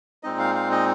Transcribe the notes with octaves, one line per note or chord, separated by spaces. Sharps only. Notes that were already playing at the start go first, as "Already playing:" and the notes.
A#2 G#3 C4 D#4 D#5
F5
F5
D#5